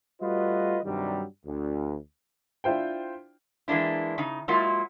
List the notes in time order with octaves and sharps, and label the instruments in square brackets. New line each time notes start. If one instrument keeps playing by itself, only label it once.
[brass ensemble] G3 A3 F4 F#4 B4 D#5
G2 C3 D#3 F#3 G3
D2
[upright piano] D4 E4 F4 C5 G5
[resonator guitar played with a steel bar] E3 G#3 A#3 D4 E4
C#3 D#4
F#3 G#3 A#3 E4 F4